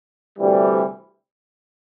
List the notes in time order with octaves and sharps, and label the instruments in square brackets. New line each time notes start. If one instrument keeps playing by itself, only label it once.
[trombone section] D2 C3 E3 G3